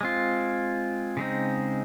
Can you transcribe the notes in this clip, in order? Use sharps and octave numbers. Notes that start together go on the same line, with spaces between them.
G#3 C4 F4
C#3 G#3 C4 D#4